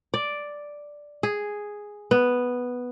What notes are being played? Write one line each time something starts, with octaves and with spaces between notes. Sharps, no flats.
D5
G#4
B3